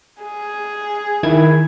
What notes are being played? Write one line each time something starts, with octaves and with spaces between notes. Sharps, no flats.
G#4
D#3 E4 G#6